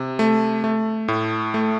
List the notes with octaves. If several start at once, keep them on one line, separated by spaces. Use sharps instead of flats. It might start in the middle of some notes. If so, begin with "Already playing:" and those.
Already playing: C3
A3
A3
A2
A3